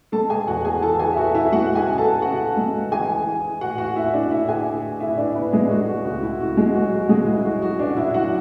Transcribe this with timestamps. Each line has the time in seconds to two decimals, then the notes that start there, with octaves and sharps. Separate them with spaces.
0.12 G#3 A4 A5
0.30 G#4 G#5
0.47 E2 F#4 F#5
0.65 G#4 G#5
0.82 E3 A4 A5
1.00 G#4 G#5
1.13 E5
1.17 E3 F#4 F#5
1.35 E4 E5
1.52 G#3 F#4 F#5
1.75 G#4 G#5
1.87 C#3
1.98 A4 A5
2.22 C#3 F#4 F#5
2.57 G#3
2.92 E3 G#4 G#5
3.26 E3
3.61 A2 F#4 F#5
3.78 F#4 F#5
3.96 A2 E4 E5
4.13 D4 D5
4.31 A2 E4 E5
4.48 G#4 G#5
4.66 A2
5.00 A2 E4 E5
5.18 D4 D5
5.35 A2 B3 B4
5.52 G#3 G#4
5.70 A3 F#4
5.88 F#4
6.05 C#2 F#4
6.23 E4
6.40 C#2 F#4
6.57 G#3 G#4
6.75 F#3 F#4
6.92 F#4
7.09 C#3 G#3 G#4
7.27 E4
7.44 F#3 F#4
7.62 F#4
7.79 C#3 D4 D5
7.97 E4 E5
8.14 F#3 F#4 F#5